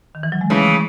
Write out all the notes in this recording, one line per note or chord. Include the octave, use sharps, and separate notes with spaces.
D#3
E3
F#3
G#3
C#3 E3 A3